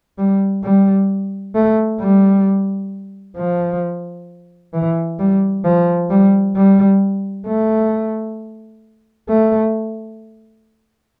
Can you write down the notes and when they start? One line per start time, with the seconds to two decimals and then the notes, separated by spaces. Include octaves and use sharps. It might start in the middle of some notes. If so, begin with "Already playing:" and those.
0.18 G3
0.63 G3
1.55 A3
2.00 G3
3.37 F3
4.74 E3
5.19 G3
5.64 F3
6.10 G3
6.56 G3
7.47 A3
9.29 A3